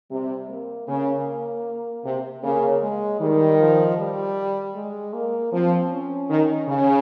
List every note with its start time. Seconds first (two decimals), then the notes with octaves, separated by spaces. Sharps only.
0.11 C3 G3
0.49 A#3
0.88 C#3 A#3
2.05 C3
2.43 C#3 A#3
2.82 G#3
3.20 D#3 G3
3.59 F3
3.98 G3
4.75 G#3
5.13 A#3
5.52 F3 C4
5.91 C#4
6.30 D#3
6.68 C#3